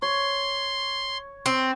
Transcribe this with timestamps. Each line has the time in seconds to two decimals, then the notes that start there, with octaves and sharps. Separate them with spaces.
0.02 C#5 C6
1.46 C4